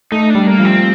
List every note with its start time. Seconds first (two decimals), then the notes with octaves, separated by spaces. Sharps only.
0.12 A3 D#4
0.30 D4
0.35 G3
0.47 A#3
0.59 F3
0.65 C4